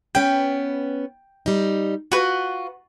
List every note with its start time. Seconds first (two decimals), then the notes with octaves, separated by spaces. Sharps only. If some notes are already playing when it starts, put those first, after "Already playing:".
0.15 B3 C#4 B4 G5
1.46 G3 D#4
2.12 F4 F#4 B4